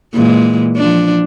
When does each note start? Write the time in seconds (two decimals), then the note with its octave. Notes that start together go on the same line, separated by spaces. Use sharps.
0.13 A#2 E3 G#3
0.77 F3 D4